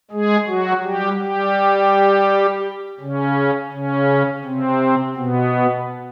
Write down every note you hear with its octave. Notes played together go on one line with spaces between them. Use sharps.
G#3 G#4
F#3 F#4
G3 G4
G3 G4
C#3 C#4
C#3 C#4
C3 C4
B2 B3